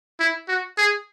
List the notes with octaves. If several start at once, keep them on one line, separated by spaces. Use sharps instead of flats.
E4
F#4
G#4